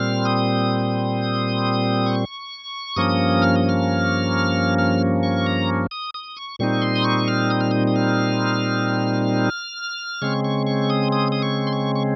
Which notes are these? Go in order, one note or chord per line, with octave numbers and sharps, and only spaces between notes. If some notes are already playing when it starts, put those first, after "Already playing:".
Already playing: A#2 G3 C4 F6
D#6
C#6
G2 F3 A#3 C#4 D#6
F6
D#6
F6
F6
C#6
A#5
D#6
D#6
C#6
A#2 G3 C4 D#4 C#6
C6
D#6
C#6
F6
D#6
F6
D#6
D#6
F6
C#3 G#3 C4 C#6
C#6
C#6
D#6
D#6
D#6
C#6
C6
C#6
C#6